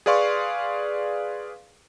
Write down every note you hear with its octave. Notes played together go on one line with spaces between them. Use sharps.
G#4 B4 D5 F5 C6 C#6